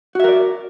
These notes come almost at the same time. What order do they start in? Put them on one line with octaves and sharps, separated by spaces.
F#4 E5 A#4 D5